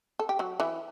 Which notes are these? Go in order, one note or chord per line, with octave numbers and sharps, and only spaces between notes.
A4
G4
F#3 F#4
E3 E4